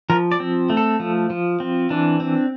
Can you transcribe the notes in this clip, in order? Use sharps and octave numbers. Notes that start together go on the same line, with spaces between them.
F3 A#4
D5
C4
A3
A4
F3
F3
C4
E3 D4
C4